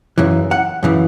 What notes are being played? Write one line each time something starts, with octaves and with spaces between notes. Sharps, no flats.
F#2 C#3 E3
F#5
F#2 C#3 E3